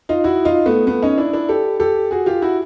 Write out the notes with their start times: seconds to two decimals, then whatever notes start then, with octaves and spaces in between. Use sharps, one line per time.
0.09 D#4 F4
0.24 E4 F#4
0.45 D#4 F4
0.66 A3 B3
0.87 A3 B3
1.02 C#4 D#4
1.18 D4 E4
1.33 D4 E4
1.49 G4 A4
1.80 G4 A4
2.11 F#4 G#4
2.26 F4 G4
2.42 E4 F#4